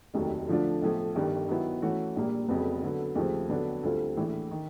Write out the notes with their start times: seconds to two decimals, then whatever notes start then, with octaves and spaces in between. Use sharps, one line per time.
0.14 F1 D#2 D#3 F#3 A3
0.48 D3 F3 A3 D4 F4
0.81 B1 A2 F3
1.15 G1 G2 D#3 G3
1.48 D#3 F#3 B3 E4
1.82 E3 A3 C#4 F#4
2.16 A#1 A#2 G3 A#3
2.48 F1 F2 C#3 F#3 B3
2.83 D3 F#3 B3
3.16 D#2 C#3 F3 A3 C4
3.49 F2 D3 F#3 B3 D4
3.83 D2 D3 G3 C4 F4
4.17 A#1 A2 E3
4.51 D#3